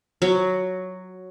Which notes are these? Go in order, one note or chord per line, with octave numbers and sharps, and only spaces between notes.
F#3